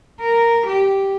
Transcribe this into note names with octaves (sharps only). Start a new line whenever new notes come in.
A#4
G4